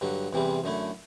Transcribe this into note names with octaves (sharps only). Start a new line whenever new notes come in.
G2 D3 F#3
E2 C3 E3 G3 C4
F#2 D3 A3 E4